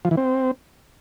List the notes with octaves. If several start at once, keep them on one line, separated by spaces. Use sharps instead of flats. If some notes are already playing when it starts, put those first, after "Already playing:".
F3
E3
C4